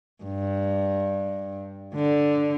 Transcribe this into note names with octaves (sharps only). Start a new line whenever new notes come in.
G2
D3